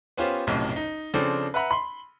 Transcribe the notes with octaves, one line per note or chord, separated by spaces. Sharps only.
B3 C#4 F4 G4 C5
F#1 B1 F2 A2 C3
D#4
C#3 F3 C4 D4 A4
B4 E5 F#5 A#5 B5
B5 C6